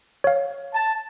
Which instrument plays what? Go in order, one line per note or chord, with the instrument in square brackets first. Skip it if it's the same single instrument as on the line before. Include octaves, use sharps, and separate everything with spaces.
[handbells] C#5 F5
[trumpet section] A5